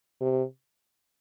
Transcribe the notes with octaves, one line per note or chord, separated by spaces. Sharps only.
C3